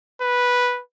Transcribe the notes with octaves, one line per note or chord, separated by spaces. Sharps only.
B4